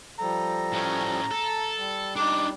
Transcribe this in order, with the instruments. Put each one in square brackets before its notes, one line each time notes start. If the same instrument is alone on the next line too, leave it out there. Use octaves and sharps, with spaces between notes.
[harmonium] F3 G3 A4 [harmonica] A#5
[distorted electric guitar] A2 C#4
A4
[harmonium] G3
[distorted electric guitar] D4 D#4 [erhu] D6